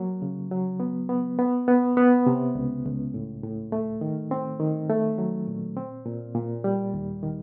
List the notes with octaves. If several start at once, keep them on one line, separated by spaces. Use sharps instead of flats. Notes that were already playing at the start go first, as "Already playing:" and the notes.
Already playing: F#3 A#3
C#3
F#3
B3
B3
B3
B3
B3
C3
C#2
C#2
A2
A2
A3
D#3
C4
D#3
A3
F#3
A#2
C4
A#2
A#2
G3
D#2
D#3